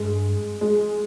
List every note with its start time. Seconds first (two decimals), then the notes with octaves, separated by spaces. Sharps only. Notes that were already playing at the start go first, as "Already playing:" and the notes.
Already playing: G2 G#3
0.61 G#3